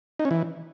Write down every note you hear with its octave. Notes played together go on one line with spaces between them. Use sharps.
D#4
C#4
E3